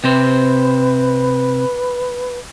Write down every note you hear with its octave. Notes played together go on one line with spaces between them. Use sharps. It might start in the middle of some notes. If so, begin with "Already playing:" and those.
C3 C4 B4 C5